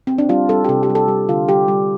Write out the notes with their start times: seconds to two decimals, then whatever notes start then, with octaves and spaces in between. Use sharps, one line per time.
0.07 C4
0.18 D4
0.29 G3 F4
0.49 G3 A4
0.64 G4
0.69 C3 A4
0.83 G4
0.89 G3
0.95 A4
1.08 G3
1.29 D3 F4
1.48 G3 G4
1.68 G3